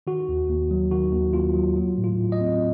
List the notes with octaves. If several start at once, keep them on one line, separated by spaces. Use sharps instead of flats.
D#3 F#4
D#2
D#2
F#3
D#3 F#4
D#2
D#2 F4
F#3
F#3
A2
F4
A2
D#5
C4